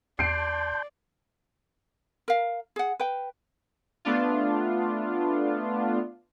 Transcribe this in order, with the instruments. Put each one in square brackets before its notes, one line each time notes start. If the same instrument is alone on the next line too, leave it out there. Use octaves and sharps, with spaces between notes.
[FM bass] E2 [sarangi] D5 [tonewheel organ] A5 C6 G6 [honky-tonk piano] C7 D7
[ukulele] A#4 F5
G#4 F#5
B4 G5
[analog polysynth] A3 B3 D4 F4